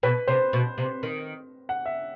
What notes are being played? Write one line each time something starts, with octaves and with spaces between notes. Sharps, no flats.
B2 B4
C3 C5
B2
C3
D#3
F#5
E5